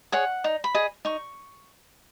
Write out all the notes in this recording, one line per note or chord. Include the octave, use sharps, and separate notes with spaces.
G#4 C#5 F#5
D#4
B5
G#4 D#5
D#4 C#6